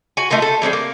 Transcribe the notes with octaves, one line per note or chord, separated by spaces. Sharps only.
F#4 G#5
A3 D#4 F4 A#4
A4
E3 G3 C4 G#4
A#3